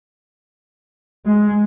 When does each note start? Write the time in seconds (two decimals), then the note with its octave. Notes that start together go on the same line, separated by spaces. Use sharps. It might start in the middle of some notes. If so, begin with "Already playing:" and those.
1.26 G#3